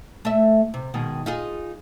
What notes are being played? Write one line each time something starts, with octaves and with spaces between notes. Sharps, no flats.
A3 E5
C3
B2 D#3 G#3
D#4 F4 G#4